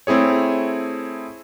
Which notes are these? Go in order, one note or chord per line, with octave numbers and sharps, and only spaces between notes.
A3 C4 E4 G#4 C#5